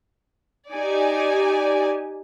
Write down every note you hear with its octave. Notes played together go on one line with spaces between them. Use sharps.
D#4 G4 D5 G#5